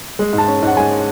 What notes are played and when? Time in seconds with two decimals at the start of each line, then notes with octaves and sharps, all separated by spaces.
0.19 G#3
0.33 G#2
0.38 A5
0.48 C#4
0.63 G#2 F#5
0.77 G#3 G#5